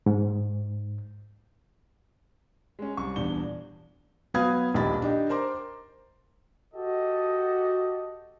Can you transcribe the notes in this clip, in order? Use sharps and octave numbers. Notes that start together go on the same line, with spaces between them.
G#2
G#3 C#4
C2 C#6
D#1 E2 D4 G7
F#3 B3 B4 F5 D#6 G#6
D#1 A#1 D#3 G4 B5 A6
D4 D#4 G4
A#4 C5 A#5 C6 D6
F#4 G4 A4 D#5